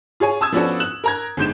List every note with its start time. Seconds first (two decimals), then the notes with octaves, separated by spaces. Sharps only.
0.20 F4 G#4 C#5 G#5
0.41 A5 D#6 E6 G#6
0.52 F3 B3 C#4 D4 F#4 A4
0.80 F#6 E7 F#7
1.04 A#4 A#5 G#6
1.37 G1 G#2 G6 E7